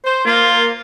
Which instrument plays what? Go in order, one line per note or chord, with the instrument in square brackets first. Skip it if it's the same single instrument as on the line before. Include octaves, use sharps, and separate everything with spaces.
[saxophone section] C5
[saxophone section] A#3 [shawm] F4